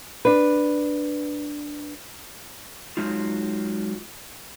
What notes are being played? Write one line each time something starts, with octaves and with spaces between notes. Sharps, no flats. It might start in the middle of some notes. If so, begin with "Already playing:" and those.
D4 B4
F#3 G#3 D#4 F4